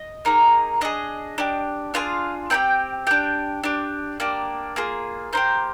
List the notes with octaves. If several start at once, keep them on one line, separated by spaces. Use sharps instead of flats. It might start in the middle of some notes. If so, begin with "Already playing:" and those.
Already playing: D#5
A#3 D#4 G#4
D4 G#4 D#5
D4 G4
D4 F4 G#4 F5
C4 D#4 G4 G5
D4 G4 G5
D4 G4
A#3 D4 G4
A#3 F4 G#4
A#3 D#4 G4 C5